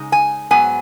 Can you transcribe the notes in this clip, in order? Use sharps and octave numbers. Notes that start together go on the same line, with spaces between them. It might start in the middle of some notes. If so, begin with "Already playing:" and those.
Already playing: C#3 G#3 D#4
G#5
G#2 F#3 B3 G#5